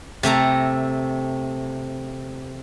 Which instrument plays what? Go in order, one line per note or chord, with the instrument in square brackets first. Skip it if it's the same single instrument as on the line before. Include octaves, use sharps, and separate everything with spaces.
[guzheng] C3 A3 A4 A#5